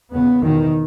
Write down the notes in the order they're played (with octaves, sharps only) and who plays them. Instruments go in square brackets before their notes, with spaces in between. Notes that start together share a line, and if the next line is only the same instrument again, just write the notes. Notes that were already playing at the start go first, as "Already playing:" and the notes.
[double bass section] E2 C#3 B3
E2 B2 D#3